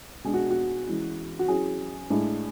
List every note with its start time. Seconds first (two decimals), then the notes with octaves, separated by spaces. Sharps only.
0.24 B2 G#3 D4 G#4
0.34 F#4
0.51 F#4
0.87 E3 G#3 C#4 E4
1.39 F#4
1.48 F#3 C#4 E4 G#4
2.10 A2 G#3 D4